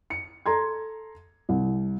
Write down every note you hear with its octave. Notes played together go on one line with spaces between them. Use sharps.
C#7
A4 A#5 C6 G#6
C2